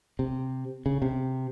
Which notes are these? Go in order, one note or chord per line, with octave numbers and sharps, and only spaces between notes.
C3
C#3
C3